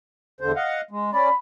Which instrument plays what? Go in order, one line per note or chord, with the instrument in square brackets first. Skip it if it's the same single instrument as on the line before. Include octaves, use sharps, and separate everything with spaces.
[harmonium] E2 D3 C5
D#5 F5 F#5
G#3
[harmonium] C#4 D5 [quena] B5